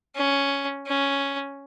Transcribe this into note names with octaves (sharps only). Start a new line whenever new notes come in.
C#4
C#4